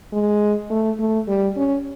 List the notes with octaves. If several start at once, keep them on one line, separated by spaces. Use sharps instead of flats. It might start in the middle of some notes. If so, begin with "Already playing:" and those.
G#3
A3
A3
G3
C#4